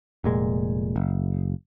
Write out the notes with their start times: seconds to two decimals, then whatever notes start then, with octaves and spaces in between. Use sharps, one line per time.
0.24 F1 A#2 G#3
0.96 F#1